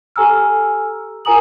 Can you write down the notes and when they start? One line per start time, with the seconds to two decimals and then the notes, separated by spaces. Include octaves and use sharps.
0.16 G4 A4 G#5 A#5 E6 F6
1.25 F4 A#4 G#5 A#5 D#6 F#7